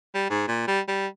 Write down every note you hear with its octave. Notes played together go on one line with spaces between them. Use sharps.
G3
G#2
A#2
G3
G3